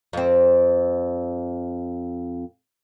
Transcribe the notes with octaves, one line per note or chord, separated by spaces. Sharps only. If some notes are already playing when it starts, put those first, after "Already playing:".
F2 C4